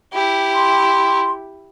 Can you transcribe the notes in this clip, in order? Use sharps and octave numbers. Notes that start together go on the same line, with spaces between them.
E4 G4
C6